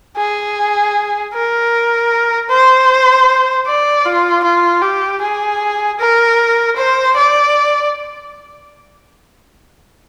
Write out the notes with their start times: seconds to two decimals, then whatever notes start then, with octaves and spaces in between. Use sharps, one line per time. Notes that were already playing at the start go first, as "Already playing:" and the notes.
0.17 G#4
1.34 A#4
2.50 C5
3.67 D5
4.05 F4
4.44 F4
4.82 G4
5.22 G#4
6.00 A#4
6.76 C5
7.16 D5